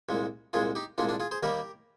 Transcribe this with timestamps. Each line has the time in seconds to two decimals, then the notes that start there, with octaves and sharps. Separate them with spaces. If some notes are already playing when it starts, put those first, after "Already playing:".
0.09 C2 A#2 G#3
0.53 C2 A#2 G#3 F4 G#4
0.75 D#4 G4
0.98 C2 A#2 G#3 D4 F4
1.09 D4 F4
1.20 F4 G#4
1.31 G#4 C5
1.43 D#2 D#3 G3 A#3 G4 A#4